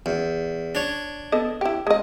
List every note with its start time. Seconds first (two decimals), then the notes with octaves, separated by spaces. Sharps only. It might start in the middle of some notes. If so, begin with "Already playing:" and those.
0.06 E2
0.75 D4 C#5
1.32 B3 A4 D#5
1.61 E4 G4
1.87 G#3 D#5